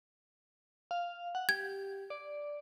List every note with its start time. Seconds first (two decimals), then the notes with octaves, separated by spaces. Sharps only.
0.91 F5
1.35 F#5
1.49 G4 G#6
2.10 D5